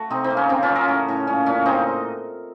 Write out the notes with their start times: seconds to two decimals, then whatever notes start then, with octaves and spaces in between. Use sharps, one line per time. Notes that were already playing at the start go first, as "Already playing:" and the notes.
Already playing: A3 F#4
0.10 C3 C4 D#4
0.24 C4 D#4
0.30 A#3
0.37 C#4
0.49 C#3 C4 D#4
0.63 C#4 F4
0.69 F#3
0.76 F#4 A#4
0.88 A2
1.08 A2
1.27 A#2 C#4
1.46 A#2 C#4
1.66 C#3 C4 D#4